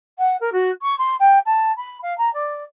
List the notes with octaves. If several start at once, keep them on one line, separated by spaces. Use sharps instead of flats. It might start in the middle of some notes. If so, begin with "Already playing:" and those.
F#5
A#4
F#4
C#6
C6
G5
A5
B5
F5
A#5
D5